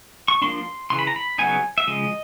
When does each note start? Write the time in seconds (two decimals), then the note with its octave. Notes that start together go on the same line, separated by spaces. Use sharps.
0.28 C#6
0.42 F3 A#3 D4 C6
0.90 C#3 E3 C6
0.99 B5
1.07 A#5
1.16 B5
1.38 C#3 F#3 B3 D#4 G#5
1.78 E5
1.87 C#3 F3 G#3 D#5